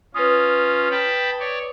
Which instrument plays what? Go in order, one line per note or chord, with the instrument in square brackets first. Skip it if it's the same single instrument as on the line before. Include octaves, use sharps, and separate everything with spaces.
[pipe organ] C#4 F4 [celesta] B4 D#6
[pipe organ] G5 A5 B5
C#5 D5